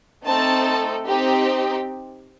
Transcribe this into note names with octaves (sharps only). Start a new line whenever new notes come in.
A3 C4 D#4 A4 A5
C4 D#4 G4